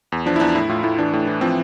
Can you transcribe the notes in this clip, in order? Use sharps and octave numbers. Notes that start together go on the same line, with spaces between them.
E2
F3 D4
E4
E2 D4
A2 E4
A2 F4
A2 E4
E3 D4
A2
E3
F3 C4